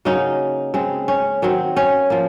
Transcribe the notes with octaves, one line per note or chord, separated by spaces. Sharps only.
C#3 F#3 A#3 C#4 D#4
C#3 G#3 C4
C#4
D#3 F#3 C4
C#4
F3 A#3